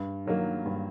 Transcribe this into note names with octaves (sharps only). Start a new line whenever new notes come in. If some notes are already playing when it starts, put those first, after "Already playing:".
Already playing: G2
D#3 F#3 A#3
G2